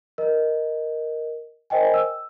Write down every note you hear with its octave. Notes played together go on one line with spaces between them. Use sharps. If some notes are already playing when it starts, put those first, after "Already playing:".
A#4 D#5
A#4 C5 D#5 G5 G#5
E6